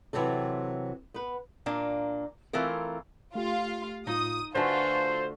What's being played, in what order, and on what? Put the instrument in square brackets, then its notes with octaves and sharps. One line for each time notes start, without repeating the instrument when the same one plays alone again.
[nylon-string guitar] C3 E3 F#3 C4 A4
B3 B4
[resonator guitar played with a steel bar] A#2 A#3 D4
E3 A3 C4 F4 A#4
[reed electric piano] A3 G4 [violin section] F4 F5
[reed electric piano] A2 F4 [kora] D#4 [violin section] D#6
[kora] D3 A3 [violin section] F4 F#4 A4 [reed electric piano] B4 G#5 [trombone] C5